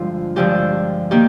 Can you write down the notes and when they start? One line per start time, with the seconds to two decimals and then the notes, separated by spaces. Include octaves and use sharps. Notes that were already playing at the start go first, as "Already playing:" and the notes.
Already playing: G2 D3 F3 G#3 F4
0.36 G2 D3 F3 G#3 G4
1.11 D#3 A#3 G4